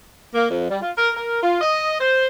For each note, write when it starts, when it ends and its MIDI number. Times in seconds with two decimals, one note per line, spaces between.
0.35 0.47 58
0.50 0.69 41
0.70 0.78 55
0.81 0.91 65
0.97 1.10 70
1.16 1.39 70
1.43 1.57 65
1.61 1.95 75
2.00 2.26 72